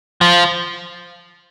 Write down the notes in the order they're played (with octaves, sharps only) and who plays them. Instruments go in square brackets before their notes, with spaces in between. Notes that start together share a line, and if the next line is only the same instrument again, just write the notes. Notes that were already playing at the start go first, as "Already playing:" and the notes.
[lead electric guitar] F3